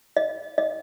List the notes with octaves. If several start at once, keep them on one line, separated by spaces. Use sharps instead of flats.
D#5
D#5